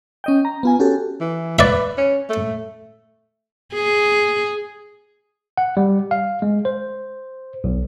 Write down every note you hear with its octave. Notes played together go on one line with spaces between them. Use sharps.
C#4 D#5 G5
A#5
B3 F4 G#5
C#4 F#4 G4 A4
E3
B4 D5 E5
C#4
A3
G#4
F#5
G3
F5
G#3
C5
B1